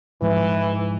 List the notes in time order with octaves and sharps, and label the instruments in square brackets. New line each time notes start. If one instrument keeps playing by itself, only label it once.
[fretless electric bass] G#2 F3 G#3 [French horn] E3